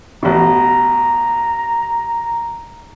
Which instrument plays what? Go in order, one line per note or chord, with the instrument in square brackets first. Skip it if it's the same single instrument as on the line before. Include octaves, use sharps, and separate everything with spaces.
[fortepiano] A1 B2 [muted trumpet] A#5